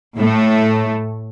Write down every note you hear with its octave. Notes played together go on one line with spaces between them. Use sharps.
A2 A3